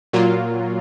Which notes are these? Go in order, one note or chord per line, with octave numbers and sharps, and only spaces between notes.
A#2 F#3 A#3 F4